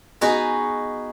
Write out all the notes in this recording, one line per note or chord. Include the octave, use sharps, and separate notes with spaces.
B3 D#4 F#4 G#4